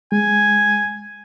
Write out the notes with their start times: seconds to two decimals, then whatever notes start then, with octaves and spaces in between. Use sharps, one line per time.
0.12 G#3 G#5